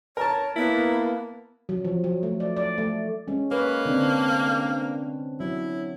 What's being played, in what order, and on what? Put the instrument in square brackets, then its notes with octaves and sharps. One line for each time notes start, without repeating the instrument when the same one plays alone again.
[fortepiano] A#4 A5 [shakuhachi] C#5
[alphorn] A#3 [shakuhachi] B3 [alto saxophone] E4
[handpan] F#3
F3
F#3
A3
D5
D5
A3
G#3 C#4
[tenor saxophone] A#3 [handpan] B4 C#5
[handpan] D3 C4 D4
[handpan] F#3 [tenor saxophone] E4